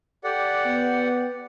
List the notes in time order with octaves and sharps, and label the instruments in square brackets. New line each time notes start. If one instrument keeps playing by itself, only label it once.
[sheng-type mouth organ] G4 D5 F#5 [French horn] A4
[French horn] B3